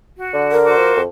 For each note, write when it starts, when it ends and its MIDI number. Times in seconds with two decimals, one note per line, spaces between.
0.17 0.57 66
0.33 0.77 50
0.52 0.98 70
0.65 1.01 66
0.65 1.01 72
0.65 1.01 86
0.78 0.92 53
0.96 1.06 41